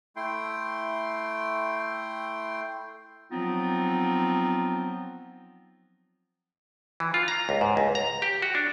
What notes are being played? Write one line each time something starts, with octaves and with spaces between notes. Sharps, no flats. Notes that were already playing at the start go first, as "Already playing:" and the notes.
A3 E4 G5 C6
F3 F#3 B3 C4 D#4 F4
E3
F4
A#5
C#2
G#2
C#2
A#5
G4
F#4
D4